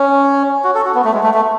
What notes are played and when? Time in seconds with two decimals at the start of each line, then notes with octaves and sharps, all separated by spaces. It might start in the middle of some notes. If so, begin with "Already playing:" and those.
Already playing: C#4
0.64 F#4
0.75 A4
0.85 F#4
0.95 B3
1.05 A3
1.13 G#3
1.23 A3
1.34 A3